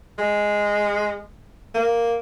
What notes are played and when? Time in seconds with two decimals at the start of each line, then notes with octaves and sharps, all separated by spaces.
0.18 G#3
1.75 A#3